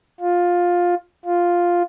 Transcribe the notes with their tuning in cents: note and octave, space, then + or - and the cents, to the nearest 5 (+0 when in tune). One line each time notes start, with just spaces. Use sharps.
F4 +15
F4 +5